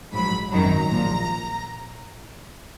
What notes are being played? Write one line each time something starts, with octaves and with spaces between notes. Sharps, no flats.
A#1 G#2 F#3 B5
G#1 F#2 D#3 F#3 A#5
A#1 A#2 F3